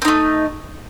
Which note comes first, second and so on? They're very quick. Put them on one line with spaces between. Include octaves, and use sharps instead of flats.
C4 D#4 A3